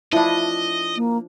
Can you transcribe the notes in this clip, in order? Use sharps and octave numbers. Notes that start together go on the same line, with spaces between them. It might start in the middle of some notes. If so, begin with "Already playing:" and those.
F3 D4 E4 D#5
A#3